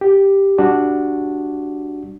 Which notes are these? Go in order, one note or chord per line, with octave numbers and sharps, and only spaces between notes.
G4
G3 D4 F#4